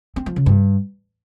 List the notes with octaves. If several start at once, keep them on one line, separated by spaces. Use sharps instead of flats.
C4
F3
C#3
G2